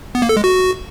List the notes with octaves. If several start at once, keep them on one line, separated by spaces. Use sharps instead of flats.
B3
A#3
A4
G#3
F#4